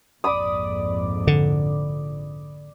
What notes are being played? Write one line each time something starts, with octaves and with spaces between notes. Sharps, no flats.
A#1 F2 G#2 D5 B5 D#6
D3